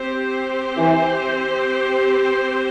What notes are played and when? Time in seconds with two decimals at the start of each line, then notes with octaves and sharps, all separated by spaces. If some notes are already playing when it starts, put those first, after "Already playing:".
Already playing: C4 G4 C5
0.77 E3